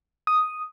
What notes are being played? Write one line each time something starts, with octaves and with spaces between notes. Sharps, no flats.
D#6